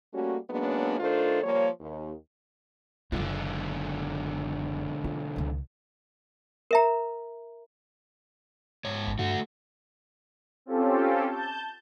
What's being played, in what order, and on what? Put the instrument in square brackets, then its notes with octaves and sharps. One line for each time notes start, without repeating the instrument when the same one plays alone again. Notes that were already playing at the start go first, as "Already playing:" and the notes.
[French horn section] G3 A3 A#3 C#4 F#4
F#3 G#3 A#3 B3 C#4 D4
D#3 A3 D4 F4 A4 C5
F3 G3 A#3 C#5
D#2
[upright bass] F#1 F4 [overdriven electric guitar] B1 D3
[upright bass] F4
C#2 D#3
[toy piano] A#4 E5 A#5
[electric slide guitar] G#2 C#5
[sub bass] G#1
[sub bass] G2 [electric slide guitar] A3 F#4
[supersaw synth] C4 C#4 F4 G4 A4
A5 G6